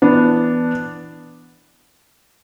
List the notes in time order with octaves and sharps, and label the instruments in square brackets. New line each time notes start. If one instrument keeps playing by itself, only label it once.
[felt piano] E3 B3 D4